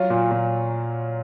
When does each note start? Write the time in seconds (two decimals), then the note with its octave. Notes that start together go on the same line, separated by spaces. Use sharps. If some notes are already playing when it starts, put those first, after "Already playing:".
Already playing: F#3 F4
0.10 A#2
0.31 A#2